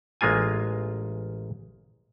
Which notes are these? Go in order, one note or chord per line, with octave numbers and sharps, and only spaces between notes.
A1 G#3 A#3 F4 G#5